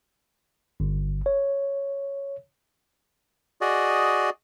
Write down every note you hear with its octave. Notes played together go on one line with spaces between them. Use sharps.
G1
C#5
F#4 G#4 D5 D#5